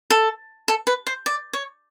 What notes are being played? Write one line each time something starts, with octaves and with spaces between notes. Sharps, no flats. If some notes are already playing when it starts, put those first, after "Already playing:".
A4
A4
B4
C5
D5
C#5